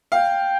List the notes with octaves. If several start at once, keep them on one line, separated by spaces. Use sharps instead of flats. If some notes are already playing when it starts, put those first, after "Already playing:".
F5 G5